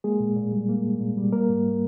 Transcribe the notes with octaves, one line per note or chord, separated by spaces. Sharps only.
G#3 A#3 G#4
A#2
A#2
G3
A#3
A#2
A#2
G3
A#3 A#4
G#2